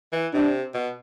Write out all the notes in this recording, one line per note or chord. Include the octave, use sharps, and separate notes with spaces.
E3
C3 D4
B2